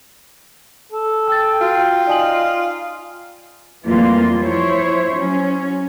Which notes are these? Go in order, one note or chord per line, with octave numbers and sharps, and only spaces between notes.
A4
G5 E6 A6
F4 F#4
D#4 D5 G#5 F#7
F2 E3 G3 A3 A#3 F4
F3 E4 C5 C#5
F#3 C#4